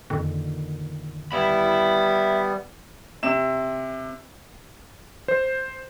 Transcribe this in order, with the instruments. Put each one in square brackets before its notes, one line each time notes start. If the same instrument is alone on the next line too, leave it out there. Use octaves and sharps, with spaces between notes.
[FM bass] F2 [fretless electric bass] A#2 D3 D#3
[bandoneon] G3 B3 [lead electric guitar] E5 B5
[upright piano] C3 E7
[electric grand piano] C5